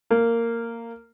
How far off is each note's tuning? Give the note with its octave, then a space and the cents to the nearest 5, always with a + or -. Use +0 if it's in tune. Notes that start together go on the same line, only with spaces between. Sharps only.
A#3 -10